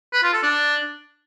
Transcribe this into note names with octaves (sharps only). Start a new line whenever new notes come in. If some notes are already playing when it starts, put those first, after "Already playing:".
B4
F4
A4
D4